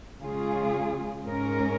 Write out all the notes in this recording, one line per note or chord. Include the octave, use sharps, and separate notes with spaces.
C#3 G#3 F4 G#4
G#2 G#3 C#4 A#4